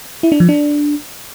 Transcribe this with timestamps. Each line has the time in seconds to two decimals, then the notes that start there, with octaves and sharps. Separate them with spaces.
0.23 E4
0.32 D4
0.40 F3
0.49 D4